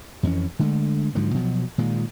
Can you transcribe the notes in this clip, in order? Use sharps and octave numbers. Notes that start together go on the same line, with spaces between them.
F2 E3 C#4
D3 G#3 A3
G#2 D3 F3 F#3
B2 F3 F#3
A#2 D#3 G#3